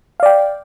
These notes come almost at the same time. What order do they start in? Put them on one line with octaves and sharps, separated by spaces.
F5 D5 G5